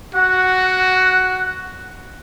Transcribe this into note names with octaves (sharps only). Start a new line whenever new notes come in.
F#4 F#5